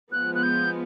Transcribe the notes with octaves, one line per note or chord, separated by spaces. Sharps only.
F3 G#3 B3 F#6
F#6
G6